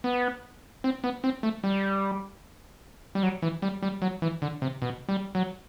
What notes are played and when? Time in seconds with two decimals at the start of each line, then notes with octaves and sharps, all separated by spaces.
0.04 B3
0.84 C4
1.04 B3
1.24 C4
1.43 A3
1.64 G3
3.15 G3
3.23 F#3
3.42 E3
3.62 G3
3.82 G3
4.02 F#3
4.22 E3
4.42 D3
4.62 C3
4.82 B2
5.09 G3
5.35 F#3